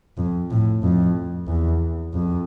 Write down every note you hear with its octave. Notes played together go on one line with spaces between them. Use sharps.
F2
A2
F2
E2
F2